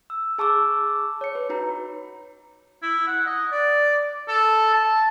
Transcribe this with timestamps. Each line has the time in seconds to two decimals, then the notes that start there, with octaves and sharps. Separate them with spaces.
0.10 E6
0.38 G#4 A5 C#6 D6 E6
1.21 C#5 C#7
1.35 B4
1.49 D#4 F#4 B4 A#5
2.82 E4
3.07 F#5
3.27 D#5
3.52 D5
4.28 A4
4.74 A5